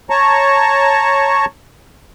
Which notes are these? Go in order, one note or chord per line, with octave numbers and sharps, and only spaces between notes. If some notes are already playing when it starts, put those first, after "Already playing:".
C#5 A5 A#5 C#6